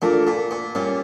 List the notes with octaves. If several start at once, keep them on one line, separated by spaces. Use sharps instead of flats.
A#2 A3 D4 F4 A#4
A#2
A#2
A#2 G3 C#4 G4